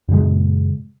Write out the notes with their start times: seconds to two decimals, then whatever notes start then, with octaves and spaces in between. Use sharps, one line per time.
0.08 F#2 A#2 C#3 G#3